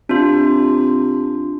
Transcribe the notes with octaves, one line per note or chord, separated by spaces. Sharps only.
C3 D4 F4